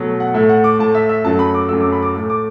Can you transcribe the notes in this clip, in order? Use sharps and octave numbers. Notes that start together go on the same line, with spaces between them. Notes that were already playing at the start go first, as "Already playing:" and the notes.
Already playing: B2 F#3 A3
F#5
A2 A3 E5
F#5
D6
A2 A3 A5
E5
E5
F#2 F#3 A3 A5
B5
D6
F#2 F#3 A3 E6
D6
B5
D6
A2 A3
D6